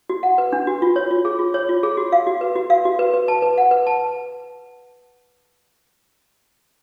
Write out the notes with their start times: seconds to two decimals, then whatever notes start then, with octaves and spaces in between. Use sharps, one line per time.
0.10 F#4
0.23 F#5
0.38 B4
0.53 D4
0.67 F#4
0.82 F4
0.96 C#5
1.11 F4
1.25 G#4
1.39 F4
1.54 C#5
1.69 F4
1.83 G#4
1.97 F#4
2.12 F5
2.27 F#4
2.41 B4
2.56 F#4
2.70 F5
2.85 F#4
2.99 B4
3.14 B4
3.28 A5
3.42 B4
3.58 F#5
3.71 B4
3.87 A5